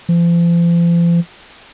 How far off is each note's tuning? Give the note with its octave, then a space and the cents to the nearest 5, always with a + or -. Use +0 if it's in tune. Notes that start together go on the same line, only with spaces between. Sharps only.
F3 -40